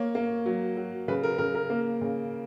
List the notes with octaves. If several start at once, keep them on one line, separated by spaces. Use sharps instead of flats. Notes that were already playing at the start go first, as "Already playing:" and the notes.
Already playing: A#3 C#5
A#3
F#3
F#3
C#3 B4
A#4
C#3 A#4
A#4
A#3
C#3